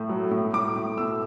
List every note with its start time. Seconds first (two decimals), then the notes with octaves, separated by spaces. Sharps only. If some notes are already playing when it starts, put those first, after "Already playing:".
Already playing: A2
0.09 F#3
0.31 A2
0.53 A2 D6
0.76 A2
0.97 B2 E6